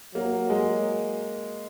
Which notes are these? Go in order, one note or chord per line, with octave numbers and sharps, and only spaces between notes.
F#3 A#3
G#3